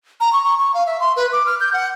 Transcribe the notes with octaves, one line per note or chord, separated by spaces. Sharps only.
A#5
C#6
C#6
C#6
F5
E5
C6
B4
D6
F6
G6
F#5